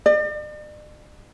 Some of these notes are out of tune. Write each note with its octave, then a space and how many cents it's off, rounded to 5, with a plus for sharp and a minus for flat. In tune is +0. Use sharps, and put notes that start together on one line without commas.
D5 +45